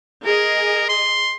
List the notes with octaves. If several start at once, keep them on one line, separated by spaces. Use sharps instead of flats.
G#4 A#4 D#5
C6